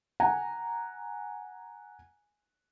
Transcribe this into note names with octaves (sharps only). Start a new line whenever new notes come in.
F#5 G#5 A#5